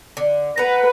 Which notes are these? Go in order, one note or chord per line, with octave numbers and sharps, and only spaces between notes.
D3
B4 F#5 A#5